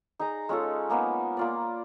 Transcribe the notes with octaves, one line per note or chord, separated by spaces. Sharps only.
D#4 G#4 D#5 A#5
G#3 C#4 F4 A4
G#3 A#3 B3 D#4
A#3 F4 D5